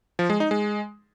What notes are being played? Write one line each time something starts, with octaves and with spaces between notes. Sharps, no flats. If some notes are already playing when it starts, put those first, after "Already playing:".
F3
G#3
D#4
G#3